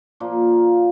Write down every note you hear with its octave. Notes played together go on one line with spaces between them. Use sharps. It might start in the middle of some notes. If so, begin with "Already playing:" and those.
A#2 F3 A#3